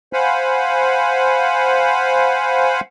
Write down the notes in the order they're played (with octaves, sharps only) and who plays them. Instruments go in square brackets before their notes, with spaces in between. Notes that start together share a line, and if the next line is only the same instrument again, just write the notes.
[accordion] C5 F5 F#5 G#5 B5